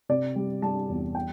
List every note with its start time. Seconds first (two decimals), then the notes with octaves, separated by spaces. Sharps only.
0.09 C3 D5
0.36 G3
0.62 G3 A5
0.89 E2
1.15 G5